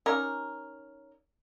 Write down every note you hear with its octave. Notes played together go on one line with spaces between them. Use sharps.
C#4 D#4 G4 A#4